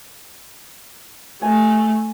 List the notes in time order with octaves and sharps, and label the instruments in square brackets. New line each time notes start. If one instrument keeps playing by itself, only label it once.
[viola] A3 [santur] G#5 A5